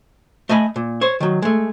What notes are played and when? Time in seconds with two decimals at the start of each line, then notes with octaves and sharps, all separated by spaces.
0.49 A3 D#5 G#5 B5
0.76 A#2
1.01 C5 C#5
1.20 D#3 F#3
1.42 G#3 A3